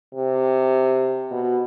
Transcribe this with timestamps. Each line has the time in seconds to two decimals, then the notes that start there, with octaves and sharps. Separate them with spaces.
0.15 C3
1.31 B2